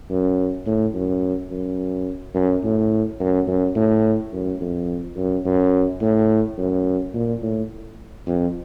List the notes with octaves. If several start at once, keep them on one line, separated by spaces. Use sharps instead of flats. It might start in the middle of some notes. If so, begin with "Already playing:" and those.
F#2
A2
F#2
F#2
F#2
A2
F#2
F#2
A2
F#2
F2
F#2
F#2
A2
F#2
A#2
A2
F2